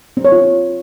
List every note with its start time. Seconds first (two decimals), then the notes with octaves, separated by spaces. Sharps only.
0.17 C4
0.25 C#5
0.32 F4